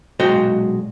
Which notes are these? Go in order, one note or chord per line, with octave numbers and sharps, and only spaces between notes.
B1 A#2 G#3 F#4 C5 G5